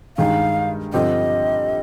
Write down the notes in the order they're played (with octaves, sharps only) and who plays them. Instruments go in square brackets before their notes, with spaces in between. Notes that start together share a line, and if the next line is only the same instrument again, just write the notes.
[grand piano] G2 D#3 G#3 D#4 [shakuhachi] F5
[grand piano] G2 D3 F3 C4 G4 [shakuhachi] D#5